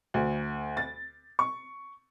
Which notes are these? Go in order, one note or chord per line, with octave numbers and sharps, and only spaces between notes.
D2
A6
C#6